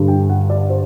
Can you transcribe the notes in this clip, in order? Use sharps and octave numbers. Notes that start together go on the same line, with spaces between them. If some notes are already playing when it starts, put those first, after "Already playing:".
Already playing: G2 D3 G3
G5
F#5
D5
C5